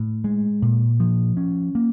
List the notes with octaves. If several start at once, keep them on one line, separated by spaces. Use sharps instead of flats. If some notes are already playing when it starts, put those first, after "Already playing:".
Already playing: A2
G#3
A#2
F3
C#4
A#3